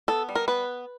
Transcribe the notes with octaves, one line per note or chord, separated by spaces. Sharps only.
B3 A4
G3
A#4
B3 B4